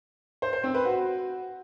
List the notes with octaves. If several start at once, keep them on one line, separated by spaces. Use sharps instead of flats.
C5
C5
C4
B4
F#4